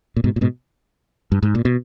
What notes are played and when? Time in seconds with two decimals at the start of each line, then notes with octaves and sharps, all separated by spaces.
0.16 A#2
0.24 G#2 B2
0.36 A#2
0.41 G#2 B2
1.32 G2
1.43 G#2
1.55 A#2
1.65 B2